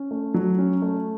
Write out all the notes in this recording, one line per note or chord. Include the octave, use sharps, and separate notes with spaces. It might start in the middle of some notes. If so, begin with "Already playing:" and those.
Already playing: C#4
A3
F#3
C#4
A3